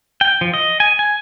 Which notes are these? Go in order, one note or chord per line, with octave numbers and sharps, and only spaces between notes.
G5
F3
D#5
G#5
G#5